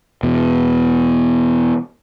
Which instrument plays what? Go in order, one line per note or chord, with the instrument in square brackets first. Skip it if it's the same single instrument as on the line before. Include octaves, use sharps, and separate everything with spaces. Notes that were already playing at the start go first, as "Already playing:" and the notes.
[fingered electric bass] E2 B2